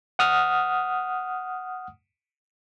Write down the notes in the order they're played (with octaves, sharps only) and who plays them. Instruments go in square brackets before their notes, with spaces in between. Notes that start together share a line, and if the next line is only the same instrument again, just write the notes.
[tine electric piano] F#5 D#6 F6